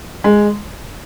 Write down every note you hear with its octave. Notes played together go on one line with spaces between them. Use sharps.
G#3